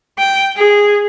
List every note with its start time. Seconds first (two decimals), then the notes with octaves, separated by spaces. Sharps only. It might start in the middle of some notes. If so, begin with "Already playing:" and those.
0.18 G5
0.57 G#4